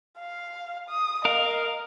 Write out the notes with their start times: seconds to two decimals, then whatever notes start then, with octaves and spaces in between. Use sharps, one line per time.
0.18 F5
0.89 D#6
1.25 A#4 D#5 F5